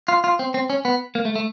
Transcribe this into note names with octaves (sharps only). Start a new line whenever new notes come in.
F4
F4
C4
C4
C#4
B3
A#3
A3
A3